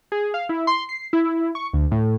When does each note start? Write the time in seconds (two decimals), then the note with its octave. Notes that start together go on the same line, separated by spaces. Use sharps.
0.12 G#4
0.34 F5
0.49 E4
0.67 C6
0.89 C7
1.13 E4
1.55 C#6
1.73 D2
1.91 A2